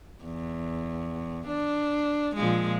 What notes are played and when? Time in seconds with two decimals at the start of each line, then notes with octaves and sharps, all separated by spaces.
0.24 E2
1.47 D4
2.35 A#2 F3 G#3